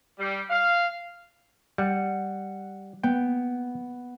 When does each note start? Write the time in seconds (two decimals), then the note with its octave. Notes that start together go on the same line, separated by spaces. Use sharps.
0.19 G3
0.50 F5
1.78 G3 F#5
3.03 B3 G5